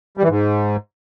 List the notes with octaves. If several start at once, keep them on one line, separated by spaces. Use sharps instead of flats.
G3
E3
G#2